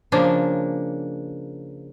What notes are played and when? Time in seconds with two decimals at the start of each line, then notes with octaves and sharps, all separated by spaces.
0.12 C#3 F3 A#3 D4